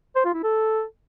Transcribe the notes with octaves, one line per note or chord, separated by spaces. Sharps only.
C5
F4
E4
A4